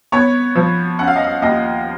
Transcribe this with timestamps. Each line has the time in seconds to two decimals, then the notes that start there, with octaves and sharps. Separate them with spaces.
0.12 B3 C#5
0.55 F3
0.99 C#4 F#5
1.07 F5
1.16 D#5
1.24 F5
1.42 D#2 D#5